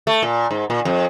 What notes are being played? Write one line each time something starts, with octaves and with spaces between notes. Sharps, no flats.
A3
A#2
G#2
A#2
F2